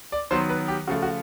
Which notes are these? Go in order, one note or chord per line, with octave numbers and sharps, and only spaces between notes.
D5
D#3 F#3 B3 C5
B4
G4
C#3 F3 A3 F#4
F#4